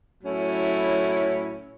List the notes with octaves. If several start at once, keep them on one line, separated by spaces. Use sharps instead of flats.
A2 F#3 C#4 E4